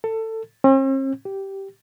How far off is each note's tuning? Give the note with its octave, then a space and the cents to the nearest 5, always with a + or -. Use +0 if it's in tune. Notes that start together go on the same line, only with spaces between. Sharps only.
A4 +20
C4 +45
G4 -10